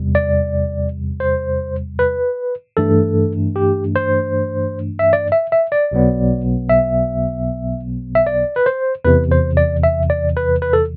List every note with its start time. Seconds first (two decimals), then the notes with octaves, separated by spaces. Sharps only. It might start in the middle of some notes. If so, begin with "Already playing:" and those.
Already playing: E2 C3 G3
0.15 D5
1.20 C5
1.99 B4
2.77 G2 E3 A3 D4 A4
3.56 G4
3.96 C5
4.99 E5
5.13 D5
5.32 E5
5.52 E5
5.72 D5
5.91 B1 B2 F#3 B3
6.70 E5
8.15 E5
8.27 D5
8.56 B4
8.66 C5
9.05 E2 C3 E3 B4
9.32 C5
9.57 D5
9.83 E5
10.10 D5
10.37 B4
10.62 B4
10.73 A4